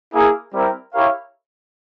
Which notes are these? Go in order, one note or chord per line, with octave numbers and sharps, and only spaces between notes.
A#3 E4 G#4
G3 C4 E4 A#4
E4 G4 A#4 C#5 F5